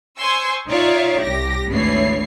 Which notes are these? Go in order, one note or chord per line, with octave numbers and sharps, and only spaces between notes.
C5 G#5 C6 C#6 E6
D#4 F4 C#5 D5 E5 F5
C2 G4 A#6
G#1 D2 E3 B3 C#5 C7